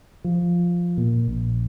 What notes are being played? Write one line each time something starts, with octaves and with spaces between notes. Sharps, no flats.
F3
A#2
A#1